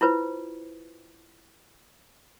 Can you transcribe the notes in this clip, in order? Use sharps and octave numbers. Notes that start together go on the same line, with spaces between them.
E4 F4 B4 C5